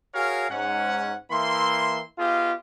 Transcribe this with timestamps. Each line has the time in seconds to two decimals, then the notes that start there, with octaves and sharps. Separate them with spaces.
0.13 F#4 G#4 A#4 C#5 F5
0.49 G#2 C#4 F#5
1.31 E3 A#3 E5 C6
2.18 B3 F4 G4 G#4 D#5 F5